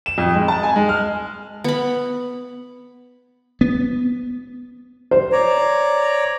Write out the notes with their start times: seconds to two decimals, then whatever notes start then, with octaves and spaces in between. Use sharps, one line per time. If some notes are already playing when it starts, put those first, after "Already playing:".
0.06 E7
0.18 F2
0.35 G#3
0.48 A5
0.63 G#5
0.76 G#3
0.89 F6
1.64 B3 B5
3.61 B3
5.11 C5
5.32 C#5 D5 A#5